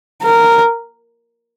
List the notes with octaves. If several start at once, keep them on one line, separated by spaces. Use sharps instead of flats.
A#4